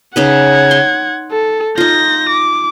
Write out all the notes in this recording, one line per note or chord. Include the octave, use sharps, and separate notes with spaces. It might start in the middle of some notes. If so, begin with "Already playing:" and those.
C#3 D#4 B4 F#5 G#6
C6
A4
D#4 F4 G6 A#6
D6